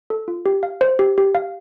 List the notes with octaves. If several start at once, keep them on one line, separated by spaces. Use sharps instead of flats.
A4
F4
G4
F5
C5
G4
G4
F5